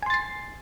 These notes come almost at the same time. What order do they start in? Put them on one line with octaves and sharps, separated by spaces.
G#5 C6 A6 C7